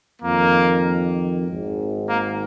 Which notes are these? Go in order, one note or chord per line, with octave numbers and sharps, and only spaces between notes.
F2 D#3 A#3
G#1 G#2 D#3
A#3